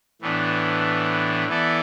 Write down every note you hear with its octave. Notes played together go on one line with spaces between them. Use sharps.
A2 E3 B3 D4
E3 B3 E4 A4 D5